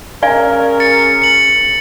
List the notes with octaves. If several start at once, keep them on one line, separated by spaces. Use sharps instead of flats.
C#4 G#4 A#4 D5 F5 G#5
A6 C#7
C#7 F#7